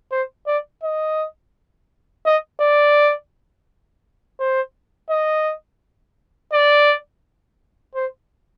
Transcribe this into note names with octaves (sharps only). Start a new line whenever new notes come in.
C5
D5
D#5
D#5
D5
C5
D#5
D5
C5